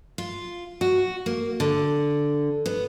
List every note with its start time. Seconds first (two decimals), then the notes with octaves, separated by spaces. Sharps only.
0.18 F4
0.81 F#4
1.26 A#3
1.60 D3
2.66 B3